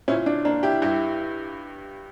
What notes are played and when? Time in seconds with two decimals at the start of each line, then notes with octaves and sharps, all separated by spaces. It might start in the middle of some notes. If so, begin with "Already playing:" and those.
0.08 A#2 C#4 E4
0.26 D4
0.45 A#3 D4
0.63 E4 G4
0.82 G2 E4 G4